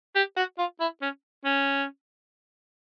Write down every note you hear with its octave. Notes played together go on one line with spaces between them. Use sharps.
G4
F#4
F4
E4
C#4
C#4